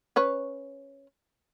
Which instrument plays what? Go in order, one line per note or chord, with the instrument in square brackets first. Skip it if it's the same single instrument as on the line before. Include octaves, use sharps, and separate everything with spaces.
[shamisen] C#4 B4 C#5